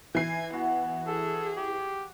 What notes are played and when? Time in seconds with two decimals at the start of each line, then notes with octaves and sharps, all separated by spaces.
0.15 E3 G#5 C7
0.53 B3 F#4
1.07 G#4 A4
1.57 G4